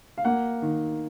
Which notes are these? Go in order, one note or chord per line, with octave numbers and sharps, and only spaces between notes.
F5
A#3 F#5
D#3